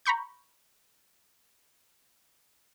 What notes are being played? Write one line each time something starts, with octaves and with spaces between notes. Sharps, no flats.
A#5 B5 C#6 G6